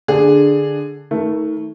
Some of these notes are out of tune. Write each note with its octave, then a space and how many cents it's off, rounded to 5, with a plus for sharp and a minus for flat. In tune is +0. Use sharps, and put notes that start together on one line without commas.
D3 +0 D4 +10 G#4 -5
D#3 +30 A3 +0 A#4 +25